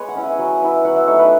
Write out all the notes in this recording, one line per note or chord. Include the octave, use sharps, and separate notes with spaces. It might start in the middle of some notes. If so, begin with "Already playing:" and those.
Already playing: G#3 B3 B4 C#5
F#5
C#4 E4
G#5
F#3
B3 E4
F#3 F#5
E5
A3 D#4 C#5
B4